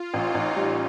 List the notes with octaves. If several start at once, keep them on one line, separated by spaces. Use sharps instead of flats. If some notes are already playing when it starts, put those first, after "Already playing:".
Already playing: F4
A1 D#4
A1
G3 C#4